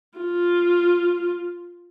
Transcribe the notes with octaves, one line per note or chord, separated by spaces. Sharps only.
F4